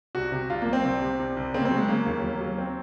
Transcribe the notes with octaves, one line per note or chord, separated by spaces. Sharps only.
C2 F#4
C3
C2 F4
A#3
F#3
C4
C2
C3
C2
C2
C#3 C4
A#3
C4
F#3
G#3
C#3 A#3
D#2
F#3
F#3
C4